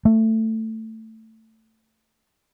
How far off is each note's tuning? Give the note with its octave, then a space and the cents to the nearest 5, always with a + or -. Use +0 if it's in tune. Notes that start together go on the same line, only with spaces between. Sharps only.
A3 +15